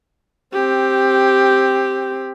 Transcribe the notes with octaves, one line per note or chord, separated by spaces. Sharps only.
C4 G4